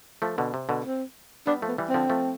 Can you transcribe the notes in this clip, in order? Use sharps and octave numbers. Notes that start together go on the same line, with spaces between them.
F3 A3
B2 D3
C3
B2 D3
C4
G3 B3 D4
F3 A3
B3
E3 G3
D3 F3 C4
F3 A3